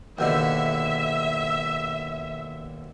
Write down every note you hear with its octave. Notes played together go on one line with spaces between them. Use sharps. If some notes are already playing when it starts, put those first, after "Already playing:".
D#2 B2 D3 E5